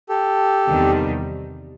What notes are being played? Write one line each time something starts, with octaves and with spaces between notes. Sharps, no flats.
G4 A4
E2 C3 D#3 G3